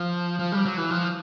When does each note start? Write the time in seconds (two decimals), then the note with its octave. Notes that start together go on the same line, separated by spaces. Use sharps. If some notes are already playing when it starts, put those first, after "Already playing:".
Already playing: F3
0.39 F3
0.52 G3
0.65 F#3
0.77 E3
0.90 F3